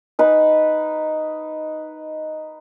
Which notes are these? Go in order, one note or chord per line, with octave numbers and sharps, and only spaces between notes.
D#4 B4